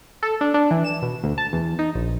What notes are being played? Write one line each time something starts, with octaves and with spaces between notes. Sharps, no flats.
A4
D4
D4
E3
E7
B2
D2
A5
E2
D#4
A#1